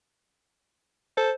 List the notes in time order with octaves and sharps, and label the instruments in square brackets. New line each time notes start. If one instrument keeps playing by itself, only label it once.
[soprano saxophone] A4 [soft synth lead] C5